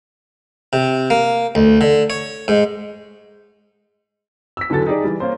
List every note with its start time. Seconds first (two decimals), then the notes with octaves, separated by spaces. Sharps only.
0.73 C3
1.10 A#3
1.55 D2
1.81 D3
2.10 C#5
2.48 G#2
4.57 E6 B6
4.70 E2 D3 F#3 A4 A6
4.87 D#4 G4 G#4 D5
5.04 E3 G3
5.20 A#3 C#4 C5